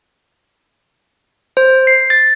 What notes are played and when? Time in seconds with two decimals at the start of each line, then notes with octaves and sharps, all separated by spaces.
1.57 C5
1.87 C7
2.10 A6